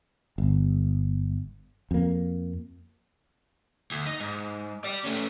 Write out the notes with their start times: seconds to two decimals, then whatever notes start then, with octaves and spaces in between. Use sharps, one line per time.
0.38 G1
1.91 F2 A#3
3.92 D2
4.06 D#4
4.21 G#2
4.84 G4 D5
5.04 A3 C#4